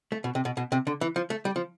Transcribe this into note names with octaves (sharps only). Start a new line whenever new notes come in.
A3
B2
C3
B2
B2
C3
D3
E3
F3
A3
G3
F3